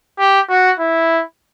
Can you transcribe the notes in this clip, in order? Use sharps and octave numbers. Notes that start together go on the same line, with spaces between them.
G4
F#4
E4